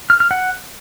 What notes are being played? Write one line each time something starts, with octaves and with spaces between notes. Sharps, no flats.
F6
F6
F#5